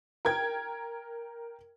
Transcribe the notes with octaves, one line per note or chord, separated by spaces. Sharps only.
A#4 G5 G#6